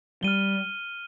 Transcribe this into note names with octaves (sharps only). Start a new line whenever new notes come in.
G3 F6 D#7 G7